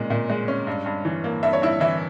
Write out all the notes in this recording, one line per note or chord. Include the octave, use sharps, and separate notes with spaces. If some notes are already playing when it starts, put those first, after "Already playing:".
Already playing: A#2 G#3 C#4
A#2
G#3
C#4
G2
G2
E3
A#3
G2 E5
C#5
G2 E4 E5
E3 E4 E5